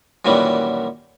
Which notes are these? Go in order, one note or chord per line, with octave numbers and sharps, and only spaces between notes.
F#2 A#2 D#3 E3 F#3 G3